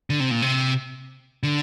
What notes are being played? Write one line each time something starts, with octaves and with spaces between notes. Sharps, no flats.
D3
C3
A#2
C3
D3